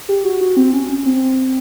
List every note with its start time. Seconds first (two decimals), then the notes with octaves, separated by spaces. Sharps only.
0.09 G4
0.25 F#4
0.41 F#4
0.57 C4
0.73 C#4
0.89 C#4
1.06 C4